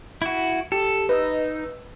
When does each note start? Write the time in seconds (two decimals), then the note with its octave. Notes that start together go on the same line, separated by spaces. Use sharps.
0.22 E4 F#4
0.72 G4 A4
1.09 D#4 B4 D#5 E6